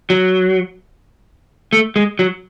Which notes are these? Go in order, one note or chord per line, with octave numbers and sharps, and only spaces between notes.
F#3
A3
G#3
F#3